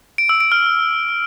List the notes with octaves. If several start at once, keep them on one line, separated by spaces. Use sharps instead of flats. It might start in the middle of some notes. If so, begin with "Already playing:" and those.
D7
E6
D7
F6